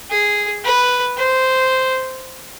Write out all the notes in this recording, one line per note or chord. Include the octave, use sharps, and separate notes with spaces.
G#4
B4
C5